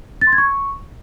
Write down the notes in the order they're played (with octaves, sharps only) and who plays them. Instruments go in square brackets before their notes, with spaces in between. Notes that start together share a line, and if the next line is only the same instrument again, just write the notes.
[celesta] A6
C6
G#6
C#6